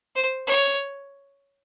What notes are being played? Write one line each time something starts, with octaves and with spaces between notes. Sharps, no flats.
C5
C#5